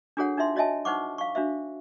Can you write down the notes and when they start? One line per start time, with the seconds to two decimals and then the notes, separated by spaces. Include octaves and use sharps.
0.17 D4 F#4 G#4 A4 C#5 F#5
0.37 D4 D#4 F4 E5 C6
0.56 F#4 C#5 D#5 E5 G#5 A5
0.85 D#4 B4 C5 F#5 C#6 D6
1.18 F5 C#6
1.35 D4 F#4 C5 E5